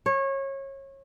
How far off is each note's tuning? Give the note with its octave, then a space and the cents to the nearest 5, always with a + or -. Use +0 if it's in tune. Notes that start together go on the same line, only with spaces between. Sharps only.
C#5 -25